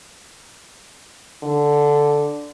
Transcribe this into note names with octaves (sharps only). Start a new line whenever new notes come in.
D3